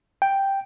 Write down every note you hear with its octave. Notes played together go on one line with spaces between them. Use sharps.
G5